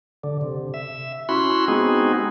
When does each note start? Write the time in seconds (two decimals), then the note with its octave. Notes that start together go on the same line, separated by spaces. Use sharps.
0.24 D3
0.41 C3
0.74 E5
1.29 C#4 E4 F#4 B5 C6
1.68 G#3 B3 C4 D#4 F#4 G#4